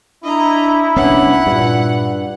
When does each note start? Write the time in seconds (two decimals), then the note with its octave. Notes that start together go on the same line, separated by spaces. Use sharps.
0.25 D4 E4 D#5 A#5
0.96 C2 B3 C#4 D4 F#5
1.47 G2 A#2